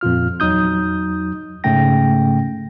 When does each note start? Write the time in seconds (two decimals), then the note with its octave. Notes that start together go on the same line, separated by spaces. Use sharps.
0.01 F2 A#2 F4 F6
0.40 E2 F#3 D#4 D#6 G6
1.64 G#2 C#3 A3 C#4 G5 A#6